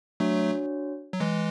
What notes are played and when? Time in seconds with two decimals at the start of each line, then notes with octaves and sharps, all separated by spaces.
0.20 F#3 A3 D4 F#4 C#5
1.13 F#3
1.20 E3 G#3